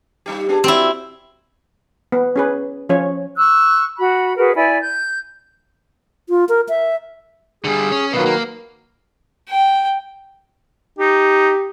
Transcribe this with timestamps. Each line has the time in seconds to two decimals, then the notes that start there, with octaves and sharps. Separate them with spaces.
0.26 G3 D#4 G4
0.49 B3 D4 G#4
0.64 C4 E4 F#4 D5
2.12 B3
2.36 C#4 G#4 B4
2.89 F3 C#4 C#5
3.38 C#6 E6 F#6
3.97 F#4 B5
4.37 F#4 G#4 A#4 B4
4.55 E4 D5 G#5 B5
4.81 G6
6.29 F4
6.49 A#4
6.69 E5
7.64 D3 G3 G#4
7.92 C#4
8.13 B2 D#3 F#3 F4 B4
8.26 A#3
9.49 G5
10.99 D#4 G4